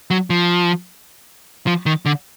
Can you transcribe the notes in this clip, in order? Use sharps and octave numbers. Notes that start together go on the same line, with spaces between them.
F#3
F3
F3
D#3
D3